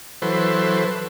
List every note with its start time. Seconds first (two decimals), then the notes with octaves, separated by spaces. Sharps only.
0.22 E3 F#3 A4 B4 C5